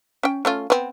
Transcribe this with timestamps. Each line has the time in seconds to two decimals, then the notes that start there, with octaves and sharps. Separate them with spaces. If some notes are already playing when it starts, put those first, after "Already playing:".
0.23 C#4 G5
0.45 A3 C#4 F4
0.70 B3 C4